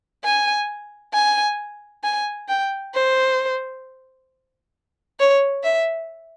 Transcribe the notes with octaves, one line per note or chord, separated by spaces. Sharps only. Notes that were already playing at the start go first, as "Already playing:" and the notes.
G#5
G#5
G#5
G5
C5
C#5
E5